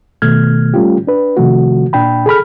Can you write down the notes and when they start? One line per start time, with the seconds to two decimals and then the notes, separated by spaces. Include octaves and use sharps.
0.22 B2 D#3 A3 F6 G#6
0.74 G3 A3 C#4 F4 G4
1.07 D4 B4
1.37 C3 D#3 F3 A3 F#4
1.93 A#2 D4 G5 B5
2.26 G#4 A4 B5 F6